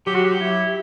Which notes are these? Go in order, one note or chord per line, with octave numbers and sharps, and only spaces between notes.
F#3 G4
F#4
G4
E4